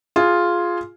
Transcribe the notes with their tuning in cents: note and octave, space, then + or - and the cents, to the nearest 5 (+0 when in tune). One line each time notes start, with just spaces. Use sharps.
F4 +0 G#4 +5